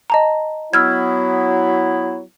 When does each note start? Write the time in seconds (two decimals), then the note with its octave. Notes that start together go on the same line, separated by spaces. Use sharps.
0.10 D#5 A5 A#5
0.74 F#3 B3 E4 E6 F6 G#6